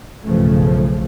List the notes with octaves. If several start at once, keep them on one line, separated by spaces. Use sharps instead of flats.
B1 G2 C#3 F3 A3